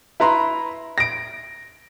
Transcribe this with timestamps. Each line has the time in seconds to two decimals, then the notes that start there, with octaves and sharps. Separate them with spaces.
0.20 E4 B4 A#5 C6
0.98 A#6 D7